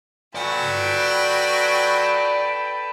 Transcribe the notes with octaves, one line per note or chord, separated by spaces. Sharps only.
F#3 F#4 A4 B4 D5 G5 G#5